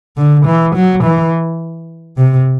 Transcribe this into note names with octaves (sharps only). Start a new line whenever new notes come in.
D3
E3
F#3
E3
C3